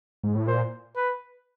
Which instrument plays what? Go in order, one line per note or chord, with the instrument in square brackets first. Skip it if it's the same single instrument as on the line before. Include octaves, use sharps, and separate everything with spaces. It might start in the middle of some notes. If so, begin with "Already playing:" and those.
[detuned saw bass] G#2
A2
[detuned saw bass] A#2 [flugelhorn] C5
[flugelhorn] B4